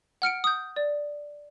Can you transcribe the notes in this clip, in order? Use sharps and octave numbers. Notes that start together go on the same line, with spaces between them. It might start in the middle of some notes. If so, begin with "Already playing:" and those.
F#5 F6 C#7 D7
D#6 G6
D5